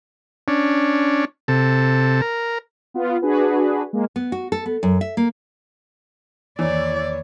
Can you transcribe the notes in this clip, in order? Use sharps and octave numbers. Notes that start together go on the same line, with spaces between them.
C#4 D4
C3 A4
A#4
B3 F4
D4 F#4 G#4 B4
G#3 A#3
B3
F#4
A4
B3
F#2
E5
A#3
E2 D#3 E3 A#3 C#5 D5